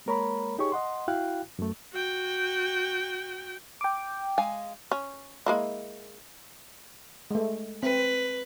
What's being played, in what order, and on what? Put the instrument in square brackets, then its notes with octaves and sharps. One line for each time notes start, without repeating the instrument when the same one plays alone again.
[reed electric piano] G#3 A#3 A#4 C#5 A#5 B5
D#4 G4 G#4 C#5 C#6
D#5 F#5 C6
E4 F#4 F5 G5 F#6
F#2 A3
[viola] F#4 G5
[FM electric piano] G5 D6
[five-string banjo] G#3 F5 G#5
[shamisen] C#4
G#3 A#3 E4
[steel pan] G#3 A3
[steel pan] C4 [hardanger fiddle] B4